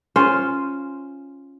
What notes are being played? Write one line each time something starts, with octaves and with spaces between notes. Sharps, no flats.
C#4 F4 G#4 C5